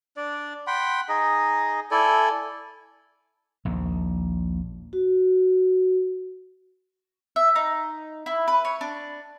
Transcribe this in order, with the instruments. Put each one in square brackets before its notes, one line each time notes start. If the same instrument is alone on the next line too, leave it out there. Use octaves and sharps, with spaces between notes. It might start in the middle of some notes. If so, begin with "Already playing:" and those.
[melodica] D4 D5
F#5 G5 B5 C6
D#4 G#4 D#5
E4 A4 D5 G#5
[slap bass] A#1 D#2
[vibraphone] F#4
[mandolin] E5
D#4
E4
B4
C#5
D4